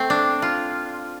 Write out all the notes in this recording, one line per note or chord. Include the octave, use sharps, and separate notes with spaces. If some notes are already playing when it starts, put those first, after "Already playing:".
Already playing: A3 C4
D4
F4